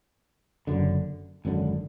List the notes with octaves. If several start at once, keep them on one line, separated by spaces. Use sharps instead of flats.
F#1 F#2 D3
G#1 F#2 D3